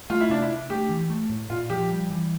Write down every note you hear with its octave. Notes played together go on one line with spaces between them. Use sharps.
A3 F4
E4
C3 D4
E4
D4
A3 G4
E3
A3
A2
A#2 F4
F3 G4
G3
E3